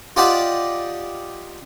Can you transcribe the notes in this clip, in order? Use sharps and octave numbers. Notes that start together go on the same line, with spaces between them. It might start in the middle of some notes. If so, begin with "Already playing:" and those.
F4 G4 D5 D#5 F#5 A5